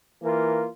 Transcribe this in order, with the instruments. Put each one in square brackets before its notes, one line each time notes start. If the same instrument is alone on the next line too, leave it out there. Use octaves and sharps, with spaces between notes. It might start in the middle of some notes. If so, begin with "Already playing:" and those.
[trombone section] E3 A#3 F4 A#4